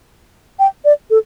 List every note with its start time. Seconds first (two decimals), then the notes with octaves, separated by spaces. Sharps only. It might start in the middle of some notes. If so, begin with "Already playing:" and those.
0.59 G5
0.85 D5
1.10 A4